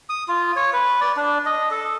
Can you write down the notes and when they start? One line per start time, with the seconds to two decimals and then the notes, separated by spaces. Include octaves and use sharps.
0.09 D#6
0.28 F4
0.56 C#5
0.73 B4
1.01 D5
1.17 D4
1.46 D#5
1.71 A4